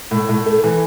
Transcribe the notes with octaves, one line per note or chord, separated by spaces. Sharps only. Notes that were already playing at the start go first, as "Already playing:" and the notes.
A2
A2
A3
E3